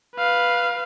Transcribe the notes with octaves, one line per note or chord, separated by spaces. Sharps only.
B4 F5